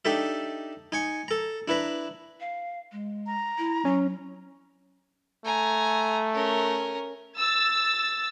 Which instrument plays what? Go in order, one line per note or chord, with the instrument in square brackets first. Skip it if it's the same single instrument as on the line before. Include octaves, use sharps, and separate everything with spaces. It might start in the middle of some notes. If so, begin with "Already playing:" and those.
[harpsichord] D4 D#4 G4 A4 E5
D#4 G#5 C#6
A4 A#5
D4 E4 B4 A#5
[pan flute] F5
G#3
[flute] A#5
[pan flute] E4
[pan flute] F#3 [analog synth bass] C#4
[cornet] A3 [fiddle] G#5 A#5
[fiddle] C#4 A#4
[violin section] E6 A6